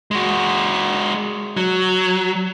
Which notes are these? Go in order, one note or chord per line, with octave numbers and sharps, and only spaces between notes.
G#3 F#4
F#3